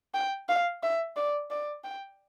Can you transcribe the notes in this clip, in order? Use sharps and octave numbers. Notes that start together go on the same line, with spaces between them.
G5
F5
E5
D5
D5
G5